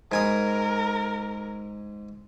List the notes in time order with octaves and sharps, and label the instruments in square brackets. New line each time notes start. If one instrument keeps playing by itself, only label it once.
[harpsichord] G#2 G#5 D#6 [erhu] A#4